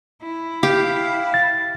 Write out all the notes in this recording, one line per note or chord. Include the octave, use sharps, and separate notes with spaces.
E4
G4 F5
A6